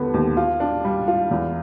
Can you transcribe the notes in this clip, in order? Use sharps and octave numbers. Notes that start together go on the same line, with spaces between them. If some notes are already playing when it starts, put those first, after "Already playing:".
Already playing: D#2 D3 B3
D#2
F4
D4
G3
F4
E2